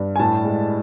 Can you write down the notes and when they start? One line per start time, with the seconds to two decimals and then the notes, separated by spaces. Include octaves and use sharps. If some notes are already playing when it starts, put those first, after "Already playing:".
Already playing: G2
0.16 G#5
0.19 A2 A5
0.45 G#3